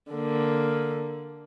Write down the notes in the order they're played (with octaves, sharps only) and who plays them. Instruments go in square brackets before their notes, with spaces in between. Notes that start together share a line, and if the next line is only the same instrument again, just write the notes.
[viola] D3 A#3